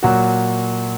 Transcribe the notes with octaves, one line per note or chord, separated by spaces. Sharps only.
A#2 F#3 F#4